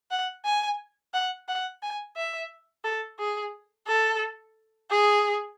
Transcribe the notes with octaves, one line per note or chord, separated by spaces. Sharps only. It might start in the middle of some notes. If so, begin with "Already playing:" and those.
F#5
G#5
F#5
F#5
G#5
E5
A4
G#4
A4
G#4